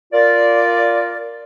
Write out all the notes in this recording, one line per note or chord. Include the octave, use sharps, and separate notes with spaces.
F4 A#4 D5